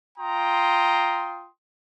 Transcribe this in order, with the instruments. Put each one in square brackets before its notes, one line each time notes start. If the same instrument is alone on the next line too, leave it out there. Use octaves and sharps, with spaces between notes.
[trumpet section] F4 G5 A#5 C6 D#6